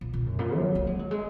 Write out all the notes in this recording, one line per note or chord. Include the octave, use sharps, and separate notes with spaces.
A#2
A#2
F#2
A#2
F#3
A#3
G#3
F#3
G#3